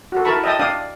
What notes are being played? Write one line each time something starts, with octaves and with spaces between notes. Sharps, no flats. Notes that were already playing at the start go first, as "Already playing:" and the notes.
F#4 A4
E4 A#4 A5 B5 C#6
D#5 E5 G5 A5 D#6
D4 D5 F5 G5 D#6